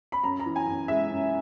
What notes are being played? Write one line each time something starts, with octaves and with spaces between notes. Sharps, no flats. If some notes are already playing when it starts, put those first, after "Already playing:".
B5
F#2 A#5
A#5
E3
G#5
F#2
G#3 E5
F#2